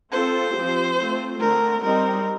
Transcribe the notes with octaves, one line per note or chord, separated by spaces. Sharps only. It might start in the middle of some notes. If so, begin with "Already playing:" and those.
C4 F4 A4 C5
F3 C4 G4
A3 C4 F4
D3 A3 C4 A#4
G3 C4 D#4 A#4